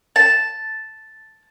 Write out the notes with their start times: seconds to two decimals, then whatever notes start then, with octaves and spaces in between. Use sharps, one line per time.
0.16 A5